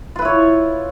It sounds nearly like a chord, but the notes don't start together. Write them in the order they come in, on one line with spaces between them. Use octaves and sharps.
F4 B4 E4 C#5